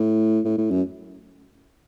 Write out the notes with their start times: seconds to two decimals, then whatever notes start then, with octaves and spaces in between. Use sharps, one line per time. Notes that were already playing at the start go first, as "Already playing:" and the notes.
Already playing: A2
0.45 A2
0.58 A2
0.71 F#2